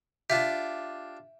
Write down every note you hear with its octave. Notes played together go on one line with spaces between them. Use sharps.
D4 F4 G4 E5